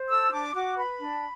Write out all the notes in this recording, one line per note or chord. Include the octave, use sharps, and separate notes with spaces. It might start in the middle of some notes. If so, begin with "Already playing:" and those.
Already playing: C5
A4 E6
D4 D6
F#4 D6
B4 B5
D4